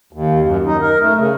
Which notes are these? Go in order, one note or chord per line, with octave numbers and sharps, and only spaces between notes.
D#2
F#2
D#4
A#4
A3
C#3